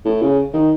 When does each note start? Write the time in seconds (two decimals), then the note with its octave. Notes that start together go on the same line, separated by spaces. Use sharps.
0.05 A2
0.22 C#3
0.53 D#3